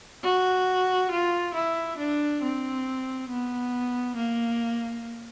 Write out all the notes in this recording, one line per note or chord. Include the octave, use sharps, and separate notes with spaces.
F#4
F4
E4
D4
C4
B3
A#3